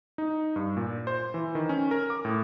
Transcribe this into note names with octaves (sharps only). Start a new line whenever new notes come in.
D#4
G2
A#2
C5
E3
D#3
C#4
A#4
D6
A2